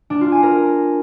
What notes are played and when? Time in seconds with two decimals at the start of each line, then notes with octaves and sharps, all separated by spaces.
0.10 D4
0.21 F4
0.32 G#5
0.43 A#4